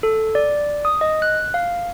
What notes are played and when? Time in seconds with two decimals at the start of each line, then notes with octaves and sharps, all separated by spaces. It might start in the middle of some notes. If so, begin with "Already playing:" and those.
0.03 A4
0.35 D5
0.85 D#6
1.01 D#5
1.22 F#6
1.54 F5